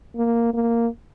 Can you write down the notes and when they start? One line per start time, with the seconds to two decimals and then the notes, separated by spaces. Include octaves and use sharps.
0.16 A#3
0.54 A#3